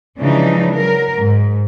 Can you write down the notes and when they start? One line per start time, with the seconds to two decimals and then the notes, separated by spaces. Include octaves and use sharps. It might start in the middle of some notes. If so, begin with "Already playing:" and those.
0.18 C#3 E3 F3 G#3 D4 D#4
0.69 F#3 A#4
1.18 G#2